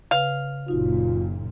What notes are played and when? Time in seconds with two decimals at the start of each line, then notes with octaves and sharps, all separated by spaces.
0.11 C#3 B4 F5
0.68 F#1 A#2 D#4 F4 F#4